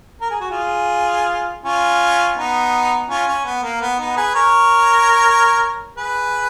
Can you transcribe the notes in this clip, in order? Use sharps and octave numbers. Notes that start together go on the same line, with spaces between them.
A#4
G#4
F#4
F4 G#4
C#4 F4
B3 D#4
C#4 F4
C#4
B3
A#3
B3
B3 D#4
G#4 B4
A#4 C#5
G#4 B4